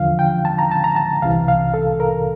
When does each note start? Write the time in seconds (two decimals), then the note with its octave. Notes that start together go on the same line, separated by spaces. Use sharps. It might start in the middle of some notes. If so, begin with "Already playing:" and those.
Already playing: E2 D3 F3 F5
0.19 G5
0.45 A5
0.59 A#5
0.71 A5
0.84 A#5
0.96 A5
1.22 C2 C3 E3 F5
1.48 F5
1.74 A4
2.00 A#4